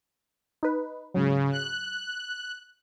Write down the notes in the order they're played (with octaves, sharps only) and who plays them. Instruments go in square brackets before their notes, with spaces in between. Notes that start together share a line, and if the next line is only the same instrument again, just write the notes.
[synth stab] D#4 B4
[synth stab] G#2 F#3 [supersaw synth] C#3
[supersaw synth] F#6